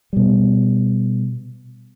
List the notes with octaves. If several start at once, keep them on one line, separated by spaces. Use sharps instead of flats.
B2 G3